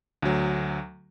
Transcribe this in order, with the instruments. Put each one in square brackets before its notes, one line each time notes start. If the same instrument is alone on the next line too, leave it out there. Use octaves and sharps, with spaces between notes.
[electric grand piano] D2 F#3